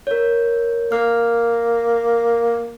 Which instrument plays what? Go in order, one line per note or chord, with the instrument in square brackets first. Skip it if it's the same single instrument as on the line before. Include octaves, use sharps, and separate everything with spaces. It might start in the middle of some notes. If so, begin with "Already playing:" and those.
[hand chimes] A#4 C#5
[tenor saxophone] A#3 [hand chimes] F6